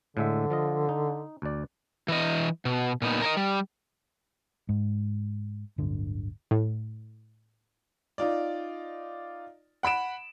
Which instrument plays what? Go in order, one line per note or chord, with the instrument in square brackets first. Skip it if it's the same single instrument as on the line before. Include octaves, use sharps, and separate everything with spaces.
[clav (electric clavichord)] A2 G#3 E5 [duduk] D3
[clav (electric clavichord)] F3 F4 D#5
D#4
D2 D5
[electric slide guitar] E3 D#5
B2
A#2 B3 D#4
A#4 C#5 D#5
G3
[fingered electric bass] G#2
D1 G1 D3
[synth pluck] A2
[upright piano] D#4 F4 D5
F#5 B5 D7 E7